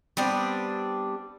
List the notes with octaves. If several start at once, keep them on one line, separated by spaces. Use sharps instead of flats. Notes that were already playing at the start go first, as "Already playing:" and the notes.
G3 B3 C4 D4